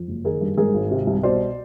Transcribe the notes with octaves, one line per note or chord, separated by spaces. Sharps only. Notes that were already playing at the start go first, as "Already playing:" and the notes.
Already playing: F2
F#1
D#3 G#4 A#4
G2
G#2 G#4 A#4
G#1
C3
C2
B2 C5 D5